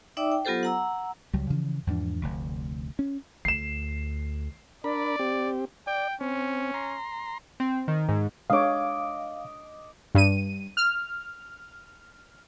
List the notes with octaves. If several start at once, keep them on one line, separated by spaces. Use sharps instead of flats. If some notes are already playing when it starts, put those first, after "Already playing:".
D#4 D5 E5 G5 D6 E6
G5
F#3 B3 F4 G4 A4 C5
F#5 A#5 E6
C#2 F#3 G3
C#3 E3 F3
E2 G#2 F3 D4
F1 D2
C#4
D2 C7 E7
D4 A#4 D5 B5
C4 G4
D5 G5
C4 C#4
A#5 C6
C4
D#3
G#2
G#3 D4 C#5 D#5 F5 D6
G2 D#7
F6